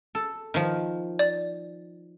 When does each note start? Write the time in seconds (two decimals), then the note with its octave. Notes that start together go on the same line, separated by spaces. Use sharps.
0.15 A4
0.54 D#3 F3
1.19 D5